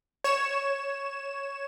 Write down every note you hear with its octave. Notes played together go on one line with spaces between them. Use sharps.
C#5 E7